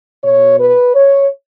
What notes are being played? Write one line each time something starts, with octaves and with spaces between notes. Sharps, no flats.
B2 C#5
B4
C#5